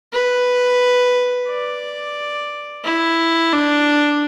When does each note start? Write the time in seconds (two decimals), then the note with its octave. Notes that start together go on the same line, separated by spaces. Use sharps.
0.13 B4
1.48 D5
2.84 E4
3.53 D4